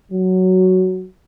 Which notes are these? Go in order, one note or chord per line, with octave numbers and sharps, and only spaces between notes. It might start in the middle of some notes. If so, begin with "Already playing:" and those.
F#3